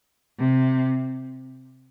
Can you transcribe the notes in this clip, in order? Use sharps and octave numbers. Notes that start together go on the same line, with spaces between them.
C3